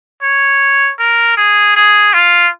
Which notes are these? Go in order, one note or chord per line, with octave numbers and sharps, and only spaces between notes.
C#5
A#4
G#4
G#4
F4